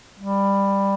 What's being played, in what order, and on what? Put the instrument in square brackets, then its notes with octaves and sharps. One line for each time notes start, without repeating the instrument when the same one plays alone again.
[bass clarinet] G3